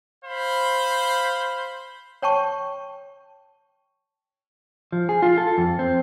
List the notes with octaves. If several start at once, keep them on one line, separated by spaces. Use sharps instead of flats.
C5 F5 B5
C#5 G5 A5 C#6
F3
G#4
F4
A4
F2
C4